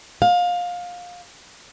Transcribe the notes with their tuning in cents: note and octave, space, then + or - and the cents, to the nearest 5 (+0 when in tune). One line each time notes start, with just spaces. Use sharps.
F5 +20